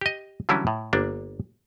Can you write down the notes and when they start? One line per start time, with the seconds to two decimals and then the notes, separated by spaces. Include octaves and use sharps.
0.01 G4 D#5
0.49 D3 E3 F#3 G3 C#4 E4
0.67 A2
0.93 G1 A#3 D4